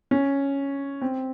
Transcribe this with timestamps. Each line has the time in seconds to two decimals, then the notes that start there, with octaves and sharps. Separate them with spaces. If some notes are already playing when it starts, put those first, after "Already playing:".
0.11 C#4
1.01 C4